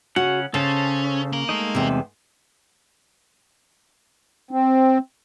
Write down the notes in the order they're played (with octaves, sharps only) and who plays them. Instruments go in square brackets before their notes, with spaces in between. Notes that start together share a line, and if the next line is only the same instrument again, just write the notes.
[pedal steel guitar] C#3 C#4 F#5 [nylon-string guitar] F#4
[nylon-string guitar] C#3 [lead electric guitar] C#4 [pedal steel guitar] A4 C5 A5
[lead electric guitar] A#3 A#4
[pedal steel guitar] G#3 A3 D#4
[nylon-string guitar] E2 C3
[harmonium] C4